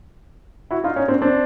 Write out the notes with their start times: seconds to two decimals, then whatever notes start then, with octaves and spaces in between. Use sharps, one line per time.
0.71 E4 F#4
0.84 D#4 F4
0.96 C#4 D#4
1.08 C4 D4
1.22 C4 D4